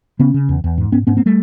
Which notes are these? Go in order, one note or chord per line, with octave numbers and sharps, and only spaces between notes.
C#3 B3 C#4
C#3
E2
E2
G#2
G#2 B3 C#4
G#2 B3 C#4
A#3 C4
G3 A3